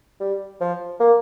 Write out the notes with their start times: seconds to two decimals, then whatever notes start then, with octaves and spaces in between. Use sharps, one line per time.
0.20 G3
0.61 F3
1.00 A#3